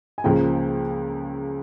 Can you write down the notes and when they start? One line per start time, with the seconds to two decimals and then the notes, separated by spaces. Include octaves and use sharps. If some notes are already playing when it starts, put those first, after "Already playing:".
0.18 G#5
0.24 C#2 C#3 F3 A#3 G5